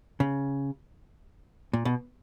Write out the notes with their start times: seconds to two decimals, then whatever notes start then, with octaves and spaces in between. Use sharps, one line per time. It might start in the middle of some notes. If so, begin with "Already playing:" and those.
0.20 C#3
1.73 A#2
1.85 B2